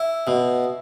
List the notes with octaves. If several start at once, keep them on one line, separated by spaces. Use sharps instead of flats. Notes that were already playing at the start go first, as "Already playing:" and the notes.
Already playing: E4
B2